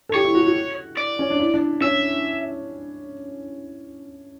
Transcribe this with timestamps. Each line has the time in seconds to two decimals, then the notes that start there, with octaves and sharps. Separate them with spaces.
0.09 A4
0.14 G4 C#5
0.25 E4
0.35 F#4
0.46 F#4
0.98 D5
1.19 C#4
1.30 D4
1.40 E4
1.54 D4
1.81 C#4 E5